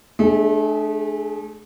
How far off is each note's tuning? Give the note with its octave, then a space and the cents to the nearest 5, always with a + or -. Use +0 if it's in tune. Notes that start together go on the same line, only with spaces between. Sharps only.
A3 -30 D4 +25 G#4 +0